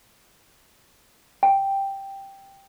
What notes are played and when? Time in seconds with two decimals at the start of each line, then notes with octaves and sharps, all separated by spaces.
1.43 G5